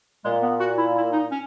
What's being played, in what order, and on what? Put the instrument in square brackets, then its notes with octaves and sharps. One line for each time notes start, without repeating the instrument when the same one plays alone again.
[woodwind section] A#2 G#3
B3
F#4
E4
E4
D#4
C#4